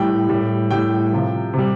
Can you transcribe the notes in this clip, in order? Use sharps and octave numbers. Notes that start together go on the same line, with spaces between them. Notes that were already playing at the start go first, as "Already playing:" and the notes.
Already playing: A2 G3 G5
A2 G3
A2 G3 G5
C3 F3
C3
G3